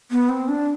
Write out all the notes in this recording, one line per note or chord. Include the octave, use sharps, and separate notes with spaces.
B3
C4
D4